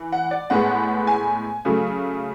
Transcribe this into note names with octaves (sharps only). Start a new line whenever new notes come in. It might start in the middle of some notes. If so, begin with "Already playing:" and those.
Already playing: E3
F#5
D5
A2 G#3 B3 F#5
G#5
C#3 F#3 A3